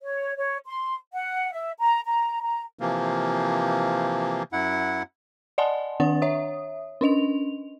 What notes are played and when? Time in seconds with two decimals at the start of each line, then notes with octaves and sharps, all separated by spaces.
0.02 C#5
0.36 C#5
0.66 C6
1.13 F#5
1.52 E5
1.79 A#5
2.05 A#5
2.43 A#5
2.79 C3 E3 F3 A#3
4.53 F#2 E4 F#5
5.58 D5 D#5 F#5 G#5 A5 C6
6.00 D#3 D4 F#5 A6
6.22 C#5 E5 D#6
7.01 C#4 D4 D#5 F7